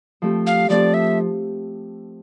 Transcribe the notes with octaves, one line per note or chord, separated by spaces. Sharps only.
F3 A3 C4 G4
F5
F3 A3 C4 G4 D5
E5